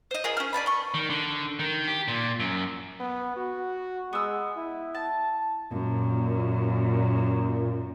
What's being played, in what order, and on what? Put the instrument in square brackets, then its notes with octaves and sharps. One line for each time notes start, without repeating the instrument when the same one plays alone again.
[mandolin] C5 D#5
F4 G#4 A#4
C#4 F6
D5 G#5 A5 B5
C6 C#6
[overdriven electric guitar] D#3
D3
D#3
G4
A#2
F#2
[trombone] B3
F#4
[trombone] G#3 [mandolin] B3 E6
[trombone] E4
[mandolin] A5
[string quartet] F#2 [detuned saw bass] A#2